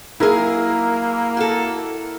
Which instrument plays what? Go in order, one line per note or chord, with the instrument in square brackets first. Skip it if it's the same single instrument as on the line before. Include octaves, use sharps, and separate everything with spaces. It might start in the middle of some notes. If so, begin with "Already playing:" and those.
[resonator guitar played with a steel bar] F#3 G#4 [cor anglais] A#3 [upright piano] E4 A#4
[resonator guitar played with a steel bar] F#4 A4